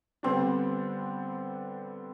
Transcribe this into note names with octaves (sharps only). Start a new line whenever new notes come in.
D3 G3 B3 C4 D4